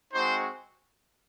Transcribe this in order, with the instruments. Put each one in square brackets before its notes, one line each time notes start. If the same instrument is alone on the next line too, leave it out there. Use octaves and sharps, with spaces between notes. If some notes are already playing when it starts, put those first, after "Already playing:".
[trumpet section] G#3 C4 D#4 F#4 C5